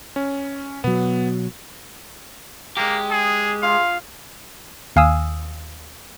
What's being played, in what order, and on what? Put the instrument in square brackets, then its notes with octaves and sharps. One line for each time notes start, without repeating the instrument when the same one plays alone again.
[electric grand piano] C#4
[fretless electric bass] B2 F#3 [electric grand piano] B3
[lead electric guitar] G#3 G4 [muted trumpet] A#3
[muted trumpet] G#4
[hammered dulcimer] F4 G#4 [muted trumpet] F5
[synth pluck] D#2 F5 G#5 D#6 E6